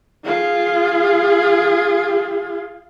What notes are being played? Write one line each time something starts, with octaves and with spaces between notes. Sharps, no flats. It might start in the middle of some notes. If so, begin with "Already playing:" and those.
F4 G#4